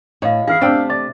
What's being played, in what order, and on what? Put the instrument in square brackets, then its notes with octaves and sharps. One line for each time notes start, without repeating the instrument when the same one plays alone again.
[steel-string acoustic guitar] A2 [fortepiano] C#5 [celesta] D#5 F5
[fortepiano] E3 E4 [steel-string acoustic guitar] G#4 [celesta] F5 F6 C7
[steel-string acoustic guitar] C3 A3 [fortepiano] D4 G5 E6
[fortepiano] D5 [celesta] D6 A6